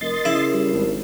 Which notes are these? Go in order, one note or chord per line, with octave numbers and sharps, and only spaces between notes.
F1 A#4 D#5 C6 A6
C#3 E4
G3
G#1